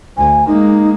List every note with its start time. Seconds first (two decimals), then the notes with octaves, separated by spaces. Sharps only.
0.17 D2 G#5
0.47 G#3 A#3 D#4